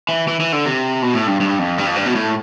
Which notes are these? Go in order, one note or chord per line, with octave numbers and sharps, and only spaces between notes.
E3
E3
E3
D3
C3
B2
A2
G2
G2
F2
G2
F2
G2
B2
A2